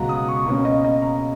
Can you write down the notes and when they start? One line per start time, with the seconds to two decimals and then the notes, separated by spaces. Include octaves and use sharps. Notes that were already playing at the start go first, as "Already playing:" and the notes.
Already playing: C#2 B2 F#3 F#5 A#5
0.09 D#6
0.29 C#6
0.46 B2 A#3 C#4
0.65 D#5
0.84 D#5
1.02 A#5